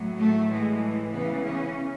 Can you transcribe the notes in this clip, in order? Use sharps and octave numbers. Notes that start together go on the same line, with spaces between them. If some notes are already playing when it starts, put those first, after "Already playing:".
Already playing: A2 F#3
A3
A2 E3 G#3
C#3 E3 B3
C#4